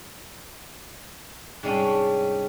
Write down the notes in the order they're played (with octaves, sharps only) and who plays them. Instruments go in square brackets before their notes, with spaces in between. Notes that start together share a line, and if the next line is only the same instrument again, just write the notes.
[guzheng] G#2 C3 G3 G#3 C#4 D4